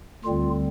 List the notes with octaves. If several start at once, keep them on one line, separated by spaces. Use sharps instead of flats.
D2 D3 G3 C4 F4